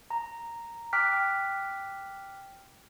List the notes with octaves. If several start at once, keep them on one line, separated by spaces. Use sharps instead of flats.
A#5
G5 D6 F6 F#6 B6